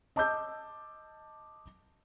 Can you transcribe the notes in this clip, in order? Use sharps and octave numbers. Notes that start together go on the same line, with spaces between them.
D#5 A5 D6 E6 G6